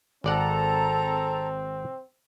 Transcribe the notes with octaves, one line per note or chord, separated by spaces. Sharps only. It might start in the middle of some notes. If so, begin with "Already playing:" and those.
G#1 C4 A4 D5 F#5 A#5